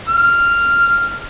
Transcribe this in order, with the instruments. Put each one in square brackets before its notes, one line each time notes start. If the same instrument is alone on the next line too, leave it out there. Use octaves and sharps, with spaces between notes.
[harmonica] F6